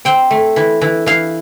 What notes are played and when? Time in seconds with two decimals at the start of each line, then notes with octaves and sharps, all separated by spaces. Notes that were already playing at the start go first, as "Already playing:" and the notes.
0.05 C4 G5
0.31 A3
0.56 E3
0.81 E3
1.06 E3 F5